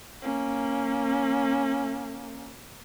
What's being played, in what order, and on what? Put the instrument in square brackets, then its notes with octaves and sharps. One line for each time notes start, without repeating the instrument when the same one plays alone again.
[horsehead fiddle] A#3 C#4